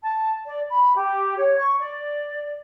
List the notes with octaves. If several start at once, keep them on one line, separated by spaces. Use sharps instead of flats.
A5
D5
B5
G4
C#5
C#6
D5